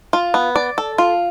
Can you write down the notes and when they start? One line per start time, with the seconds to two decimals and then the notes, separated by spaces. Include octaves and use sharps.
0.13 F4
0.34 B3
0.56 D5
0.78 A4
0.98 F4